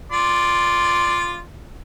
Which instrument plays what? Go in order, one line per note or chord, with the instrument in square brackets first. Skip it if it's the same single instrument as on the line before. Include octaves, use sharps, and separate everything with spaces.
[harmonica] F4 D5 C6